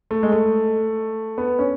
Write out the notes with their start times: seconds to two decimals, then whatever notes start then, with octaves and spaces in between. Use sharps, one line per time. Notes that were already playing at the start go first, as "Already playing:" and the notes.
0.11 A3
0.23 G#3
0.32 A3
1.38 B3
1.59 C#4